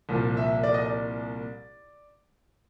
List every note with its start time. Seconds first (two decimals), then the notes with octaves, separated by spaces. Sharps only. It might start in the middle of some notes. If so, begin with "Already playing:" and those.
0.09 C2 A#2 F3
0.37 E5
0.63 D5
0.74 D#5
0.85 D5